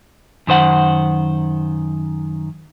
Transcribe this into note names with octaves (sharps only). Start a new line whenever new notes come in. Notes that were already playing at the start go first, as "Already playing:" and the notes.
F#2 D#3 C5 F#5